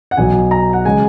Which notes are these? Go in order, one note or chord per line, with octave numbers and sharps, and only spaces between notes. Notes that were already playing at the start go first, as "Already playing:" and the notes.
F#5
B1 B2 F#3 G#5
A#5
F#5
C#3 G#3 G#5